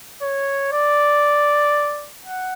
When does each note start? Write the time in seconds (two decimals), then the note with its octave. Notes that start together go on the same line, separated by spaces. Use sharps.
0.22 C#5
0.73 D5
2.25 F#5